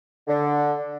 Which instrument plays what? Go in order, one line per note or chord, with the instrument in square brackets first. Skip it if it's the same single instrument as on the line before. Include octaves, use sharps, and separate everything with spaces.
[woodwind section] D3